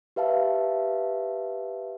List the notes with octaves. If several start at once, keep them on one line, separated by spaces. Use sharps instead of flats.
G4 B4 E5 F5 A5